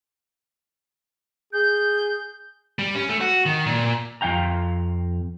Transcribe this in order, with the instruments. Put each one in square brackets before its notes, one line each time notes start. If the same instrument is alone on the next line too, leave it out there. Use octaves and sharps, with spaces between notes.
[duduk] G#4 [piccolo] G6
[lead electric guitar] G3
C#4
A3
F#4
D#3
A#2
[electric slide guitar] F2 F5 G5 A#5